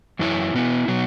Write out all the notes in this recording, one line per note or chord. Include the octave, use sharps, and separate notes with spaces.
F#2 E3 B3 E4 C#5
B2 B3 E4
B2 F#3 B3